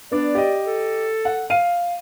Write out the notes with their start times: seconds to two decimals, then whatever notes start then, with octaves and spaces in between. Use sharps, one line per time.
0.11 B3 D4 D5
0.35 G4 D#5
0.66 A4
1.25 F#5
1.50 F5 D#7